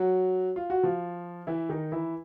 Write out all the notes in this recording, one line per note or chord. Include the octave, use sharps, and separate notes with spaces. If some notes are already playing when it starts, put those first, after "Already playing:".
Already playing: F#3 F#4
F4
F#4
F3 F4
E3 E4
D#3 D#4
E3 E4